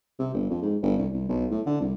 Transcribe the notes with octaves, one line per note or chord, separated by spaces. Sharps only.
C3
G1
F2
G#2
G1
C2
C2
B1
A2
D3
C2